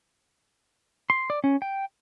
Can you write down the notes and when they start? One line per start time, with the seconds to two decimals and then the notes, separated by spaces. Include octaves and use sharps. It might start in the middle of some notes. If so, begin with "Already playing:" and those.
1.10 C6
1.30 D5
1.44 C#4
1.62 G5